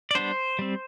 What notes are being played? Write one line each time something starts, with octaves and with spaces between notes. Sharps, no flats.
D5
G3 B3 D4 C5
G3 C4